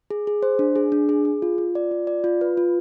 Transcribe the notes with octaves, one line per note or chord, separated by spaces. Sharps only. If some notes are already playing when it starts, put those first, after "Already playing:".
G#4
G#4
C5
D4
G#4
D4
G#4
G#4
F4
F4
D5
F4
D5
F4
B4
F4